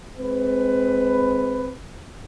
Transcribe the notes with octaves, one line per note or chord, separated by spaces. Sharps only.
G#3 C4 B4